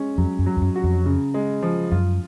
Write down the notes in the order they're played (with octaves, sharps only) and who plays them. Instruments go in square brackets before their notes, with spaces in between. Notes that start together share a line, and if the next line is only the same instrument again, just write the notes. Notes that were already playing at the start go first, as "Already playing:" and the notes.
Already playing: [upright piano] G#3 C#4
[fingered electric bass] F2 [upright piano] F#3
[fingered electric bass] F#2
[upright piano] F#3
[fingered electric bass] F2
F#2
[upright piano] F#4
[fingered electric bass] F2
[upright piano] C#3
G#3
F3
[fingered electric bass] F#2 [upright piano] F4